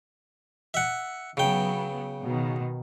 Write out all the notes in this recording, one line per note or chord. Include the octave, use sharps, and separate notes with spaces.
E5 F#5
C#3 F#3 B3 G5
B2 D#3